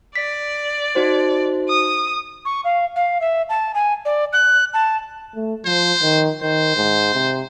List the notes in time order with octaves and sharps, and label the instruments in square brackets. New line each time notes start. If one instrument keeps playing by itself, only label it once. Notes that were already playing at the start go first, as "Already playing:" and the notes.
[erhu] D5 [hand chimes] B6
[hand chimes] D#4 F#4 C5
[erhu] D#6
[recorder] C#6
F5
F5
E5
A5
G#5
D5
F#6
A5
[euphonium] A3
[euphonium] F3 [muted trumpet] C5
[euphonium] D#3
[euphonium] D#3 [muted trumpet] C5
[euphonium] G#2
C3